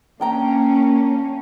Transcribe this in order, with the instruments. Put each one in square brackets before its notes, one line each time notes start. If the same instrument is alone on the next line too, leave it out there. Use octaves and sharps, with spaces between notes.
[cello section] A#3 C#4 [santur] D4 G5 A#5